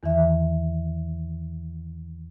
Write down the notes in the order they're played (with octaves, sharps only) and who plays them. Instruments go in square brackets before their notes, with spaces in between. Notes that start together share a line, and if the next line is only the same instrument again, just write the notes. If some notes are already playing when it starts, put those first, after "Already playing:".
[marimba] E2 D#3 E3 E5